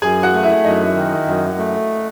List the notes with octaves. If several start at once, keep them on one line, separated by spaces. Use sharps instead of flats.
F#2 G#4 G#5
F#4 F#5
A3
E4 E5
F#2 D#4 D#5
D#3
F#2
A3